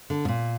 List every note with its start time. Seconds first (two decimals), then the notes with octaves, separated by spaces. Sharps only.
0.10 D3
0.25 B2
0.28 A#2